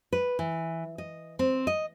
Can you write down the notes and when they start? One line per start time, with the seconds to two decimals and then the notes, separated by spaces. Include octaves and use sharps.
0.13 B4
0.39 E3
0.98 D#5
1.39 C4
1.67 D#5